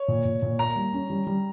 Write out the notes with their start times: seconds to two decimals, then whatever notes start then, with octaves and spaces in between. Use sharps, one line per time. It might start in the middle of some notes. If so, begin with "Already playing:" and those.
Already playing: C#5
0.08 A#2
0.25 A#2
0.42 A#2
0.59 A#3 A#5
0.76 G3
0.93 C#4
1.10 G3
1.27 G3